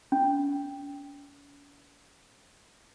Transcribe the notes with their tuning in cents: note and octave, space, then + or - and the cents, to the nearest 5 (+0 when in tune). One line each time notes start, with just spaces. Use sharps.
C#4 +45